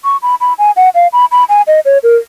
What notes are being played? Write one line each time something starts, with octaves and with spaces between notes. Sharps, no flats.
C#6
B5
B5
G#5
F#5
F5
B5
B5
G#5
D#5
C#5
A#4